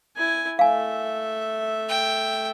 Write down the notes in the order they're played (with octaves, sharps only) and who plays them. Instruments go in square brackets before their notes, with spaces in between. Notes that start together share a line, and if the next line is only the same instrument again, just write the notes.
[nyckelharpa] E4 G#5
[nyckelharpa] A3 E5 [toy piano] F5 G#5
[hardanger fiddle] G5